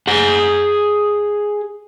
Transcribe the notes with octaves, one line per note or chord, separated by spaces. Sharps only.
G#4 F#5